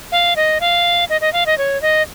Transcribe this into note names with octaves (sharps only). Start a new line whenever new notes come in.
F5
D#5
F5
D#5
D#5
F5
D#5
C#5
D#5